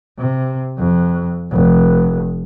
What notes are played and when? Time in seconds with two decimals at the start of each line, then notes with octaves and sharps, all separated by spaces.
0.19 C3
0.78 F2
1.52 F1